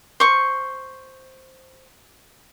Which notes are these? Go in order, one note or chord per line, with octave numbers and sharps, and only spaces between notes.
C5 C#6